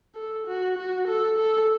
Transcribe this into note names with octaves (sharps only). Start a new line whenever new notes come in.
A4
F#4
F#4
A4
A4